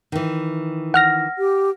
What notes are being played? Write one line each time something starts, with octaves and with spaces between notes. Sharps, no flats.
D#3 E3
F#5 F6 A#6
G4